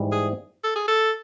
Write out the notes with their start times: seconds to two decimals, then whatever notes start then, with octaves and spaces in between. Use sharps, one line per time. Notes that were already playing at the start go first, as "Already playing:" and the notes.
Already playing: G#2 E3 G3
0.12 G#4
0.64 A4
0.76 G#4
0.88 A4